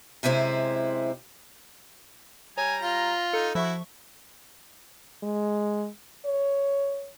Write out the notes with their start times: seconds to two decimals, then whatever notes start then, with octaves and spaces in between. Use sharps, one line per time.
0.23 F#2 C3 G#3 E4 C5
2.58 G3 C#5 G#5 A#5
2.82 F4 A#6
3.33 D#4 A4
3.55 F3 E4 F#4 E5 C#6
5.23 G#3
6.26 C#5